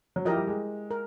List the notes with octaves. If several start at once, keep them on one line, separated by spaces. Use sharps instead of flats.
F#3
F3 E4 G4 A#4 D#5
G3
G#3
A#4